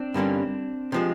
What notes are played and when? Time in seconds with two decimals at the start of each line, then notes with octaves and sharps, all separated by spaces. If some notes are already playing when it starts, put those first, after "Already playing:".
Already playing: C4 D4
0.14 G2 D3 G3 A#3 C#4
0.92 C3 F3 G#3